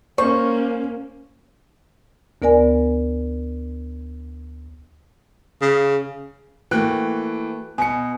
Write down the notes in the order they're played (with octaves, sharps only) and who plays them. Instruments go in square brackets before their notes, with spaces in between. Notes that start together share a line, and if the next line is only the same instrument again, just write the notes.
[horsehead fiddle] A#3 C#4 [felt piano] C5 [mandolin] C#6
[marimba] D2 B3 A#4 D5 G#5
[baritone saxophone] C#3
[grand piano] E3 G5 F#6 [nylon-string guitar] A3 A#3 F#4
[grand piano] B2 C#7 [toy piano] G#5